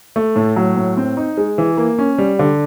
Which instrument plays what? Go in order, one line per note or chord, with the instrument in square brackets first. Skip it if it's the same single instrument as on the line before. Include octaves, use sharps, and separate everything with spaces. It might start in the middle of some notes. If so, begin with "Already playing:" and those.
[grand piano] A3
A2
F#3
A2
C4
D#4
G#3
E3
A#3
C#4
G3
D3